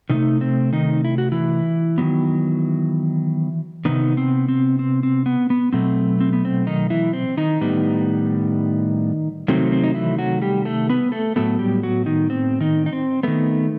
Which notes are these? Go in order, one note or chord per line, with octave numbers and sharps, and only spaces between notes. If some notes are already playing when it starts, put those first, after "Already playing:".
C3 D#3 A3 D#4
C4
D#3 D#4
E4
F#4
E3 E4
D#3 F#3 B3
C3 D#3 B3 D#4
C4
C4
C4
C4
B3
B3
B2 F#3 A3 C4
C4
B3
C4
D#3 D#4
E3 E4
C4
D#3 D#4
A2 G3 B3
C3 D#3 F#3 A3 C4
C4
D#4
E3 E4
F#3 F#4
G3 G4
A3 A4
B3 B4
A3 A4
A2 F#3 A3 B3 A4
G3 G4
F#3 F#4
D#3 D#4
C4
D#3 D#4
D#4
C4
D#3 A3 B3